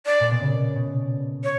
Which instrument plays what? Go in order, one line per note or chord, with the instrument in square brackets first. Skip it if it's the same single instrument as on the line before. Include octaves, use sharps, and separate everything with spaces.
[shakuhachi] D5
[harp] A#2
B2
C#3
B2
[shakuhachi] C#5